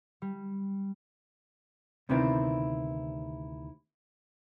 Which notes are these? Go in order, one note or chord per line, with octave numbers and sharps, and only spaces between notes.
G3
D2 C3 D#3 B3 C4 E4